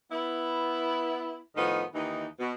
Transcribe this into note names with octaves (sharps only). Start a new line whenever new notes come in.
B3 E4
A2 D#3 F3 B3 D#4
D#2 E3 D#4
B2